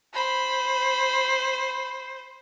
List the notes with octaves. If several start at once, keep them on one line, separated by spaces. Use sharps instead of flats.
C5 B5